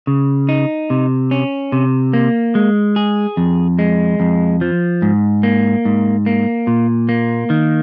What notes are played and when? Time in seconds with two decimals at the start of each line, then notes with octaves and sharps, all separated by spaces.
0.07 C#3
0.49 D#4
0.90 C3
1.31 C#4
1.72 C3
2.13 A#3
2.55 G#3
2.96 G#4
3.37 F2
3.79 G#3
4.20 F2
4.61 F3
5.02 G#2
5.43 A#3
5.85 G#2
6.26 A#3
6.67 A#2
7.09 A#3
7.50 D#3